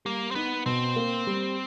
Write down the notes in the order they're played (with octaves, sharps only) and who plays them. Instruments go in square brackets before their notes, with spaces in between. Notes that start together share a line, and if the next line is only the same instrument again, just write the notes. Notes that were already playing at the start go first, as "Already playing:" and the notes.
[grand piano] G3 [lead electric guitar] A#3
[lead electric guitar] C4
[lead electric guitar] B3 [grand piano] D#4
[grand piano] B2 [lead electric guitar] C4
[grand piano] A#3
G3